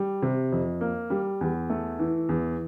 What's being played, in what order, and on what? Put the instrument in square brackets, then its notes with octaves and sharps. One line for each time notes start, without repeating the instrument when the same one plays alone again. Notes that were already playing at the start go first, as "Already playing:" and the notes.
Already playing: [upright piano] G3
C3
F2
A#3
G3
E2
A3
E3
E2